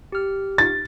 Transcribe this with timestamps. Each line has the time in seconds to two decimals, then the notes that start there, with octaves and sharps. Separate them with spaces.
0.12 G4 F6
0.58 A6